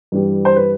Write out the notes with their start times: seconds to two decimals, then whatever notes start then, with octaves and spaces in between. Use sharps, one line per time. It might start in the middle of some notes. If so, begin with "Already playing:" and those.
0.12 G2 E3 G3
0.45 C5
0.56 B4